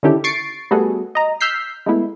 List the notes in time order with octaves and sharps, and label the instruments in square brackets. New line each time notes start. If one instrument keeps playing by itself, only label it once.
[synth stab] D3 D#3 C#4 E4 G4 A4
C#6 A6 C7 D7
G3 A3 B3 F#4 G#4 A4
D#5 A#5
E6 F6 G6 B6 C7
G#3 A3 B3 E4